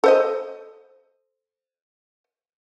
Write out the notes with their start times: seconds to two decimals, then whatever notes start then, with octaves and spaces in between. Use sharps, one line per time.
0.04 A4 C5 D#5